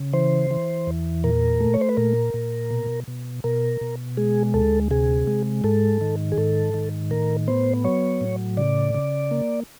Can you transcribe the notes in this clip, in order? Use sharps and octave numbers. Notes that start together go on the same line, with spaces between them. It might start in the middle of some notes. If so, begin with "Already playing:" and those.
Already playing: C#3
E3 C5
E3
E2
A#2 A#4
A3
C#5
C5
B4
A#2 A#4
A#2
B2
B2
B2 A#4
B2
G#3 G#4
D2 A4
C3 G#4
G#3
G#2 A4
D#3
G#4
G#2 A4
D#3
A2 A#4
B3 C5
F#3 C#5
A2
C#3 D5
C#3
A#3